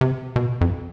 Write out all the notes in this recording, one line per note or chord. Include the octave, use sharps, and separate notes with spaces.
C3
B2
F2